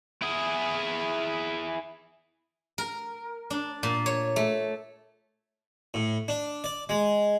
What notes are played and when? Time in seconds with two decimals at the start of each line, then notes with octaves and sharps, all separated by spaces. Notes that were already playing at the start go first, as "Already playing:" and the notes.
0.22 E4 G#4
2.78 A#4
3.50 D4
3.83 A#2
4.06 C#5
4.36 A3
5.94 A2
6.28 D4
6.64 D5
6.89 G#3